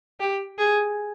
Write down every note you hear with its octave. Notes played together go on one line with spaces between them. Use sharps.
G4
G#4